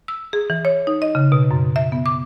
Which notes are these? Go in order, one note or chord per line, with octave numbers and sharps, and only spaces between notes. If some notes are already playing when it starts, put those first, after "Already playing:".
E6
G#4
E3
C#5
D#4
D#5
C#3
B2
F#2
E5
B3
D6